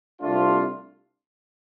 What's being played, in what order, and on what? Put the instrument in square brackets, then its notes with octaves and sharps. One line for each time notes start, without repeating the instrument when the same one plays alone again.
[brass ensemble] C2 C3 A3 D4 F4